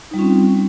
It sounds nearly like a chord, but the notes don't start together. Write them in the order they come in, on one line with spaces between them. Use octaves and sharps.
D#4 G3 F4 C#4 C4